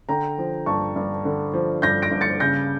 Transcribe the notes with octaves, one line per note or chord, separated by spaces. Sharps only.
D3 G5 A#5
F3
G2 A5 C#6
G2
D3
F3
G2 G6 A#6
A#6 D7
G2
A6 C#7
C#3 G6 A#6